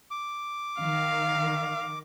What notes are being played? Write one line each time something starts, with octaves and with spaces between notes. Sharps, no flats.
D6
D#3 F5